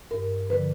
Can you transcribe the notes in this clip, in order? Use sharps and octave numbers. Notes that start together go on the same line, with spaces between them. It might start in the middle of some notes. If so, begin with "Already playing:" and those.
G2 A#4
D3 F3 B4